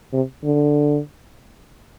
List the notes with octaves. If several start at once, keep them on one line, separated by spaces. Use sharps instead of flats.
C3
D3